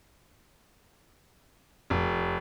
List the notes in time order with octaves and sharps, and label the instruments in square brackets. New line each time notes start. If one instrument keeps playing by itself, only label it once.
[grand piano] F1